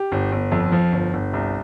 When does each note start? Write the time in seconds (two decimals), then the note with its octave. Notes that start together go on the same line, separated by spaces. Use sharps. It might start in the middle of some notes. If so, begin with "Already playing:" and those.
Already playing: G4
0.12 G1
0.32 G1
0.52 F2
0.72 F3
0.92 G1
1.13 G1
1.33 C2